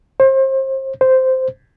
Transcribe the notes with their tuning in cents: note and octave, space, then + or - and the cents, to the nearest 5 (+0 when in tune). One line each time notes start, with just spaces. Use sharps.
C5 +35
C5 -5